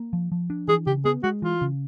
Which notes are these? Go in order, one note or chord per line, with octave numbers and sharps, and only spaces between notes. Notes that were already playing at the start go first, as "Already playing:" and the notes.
Already playing: A#3
F3
F3
D4
E3 G#4
C#3 G4
B3 G#4
G#3 F#4
E3 F4
C#3